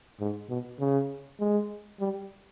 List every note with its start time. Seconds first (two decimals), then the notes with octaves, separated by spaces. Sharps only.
0.20 G#2
0.49 B2
0.80 C#3
1.40 G#3
2.00 G3